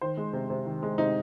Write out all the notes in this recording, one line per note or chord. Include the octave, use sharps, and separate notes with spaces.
D#3 C5
G#3
C3
C3
D#3
G#3
C3 D#4